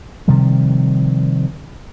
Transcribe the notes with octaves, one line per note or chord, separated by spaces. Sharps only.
C3 D#3 F3 G3